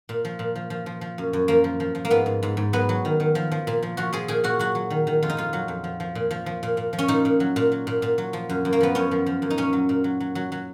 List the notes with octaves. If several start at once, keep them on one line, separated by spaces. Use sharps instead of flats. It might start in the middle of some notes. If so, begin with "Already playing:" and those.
A#2
F3
A#2
F3
F3
F3
F3
F#2
F#2
F3 A#3
F3
F3
F3
A#3
G#2 B3
G#2
G#2
G#2
F#3 B3
F#3
D#3
D#3
F3
F3
A#2
F3
F3 F#4
F3 G#4
A#2 G#4
A#2 F#4
F#3 F#4
F#3
D#3
D#3
F2 F4
D#4
F2 F4
F#3
F2
F3
F3
A#2
F3
F3
A#2
A#2
F3
C#4
A#2 D#4
A#2
F#3
A#2
F#3
A#2
A#2
F#3
F3
F#2
F#2
A#3
F3 B3
F#2 C#4
F3
F3
F#2
D#4
A#2 C#4
F#3
A#2
F#3
F#3
F#3
F#3